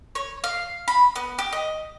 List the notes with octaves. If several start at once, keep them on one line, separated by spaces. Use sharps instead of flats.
C#5
F5
B5
B3
G4
D#5